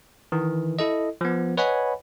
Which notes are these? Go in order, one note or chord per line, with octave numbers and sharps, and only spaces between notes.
D#3 E3
E4 A4 D#5
F3 B3
B4 C#5 D#5 F#5 G#5 B5